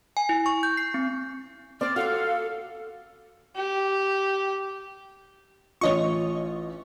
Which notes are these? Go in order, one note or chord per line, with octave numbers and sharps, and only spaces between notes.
G#5
E4
C#6
G6
C7
C4
C4 C5 D5 F6
F4 F#4 A4 F5
G4
A1 F4 C#5 D#5 C#6